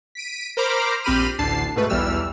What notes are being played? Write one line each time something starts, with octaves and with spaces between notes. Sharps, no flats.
B6 D7 D#7
A#4 C5 A#5 B5 D6 F6
A#1 C4 G4 B5 F6 D#7
A1 D2 D3 A5 C7
G#2 B2 A3 B4
B1 E2 E3 G3 E6 F6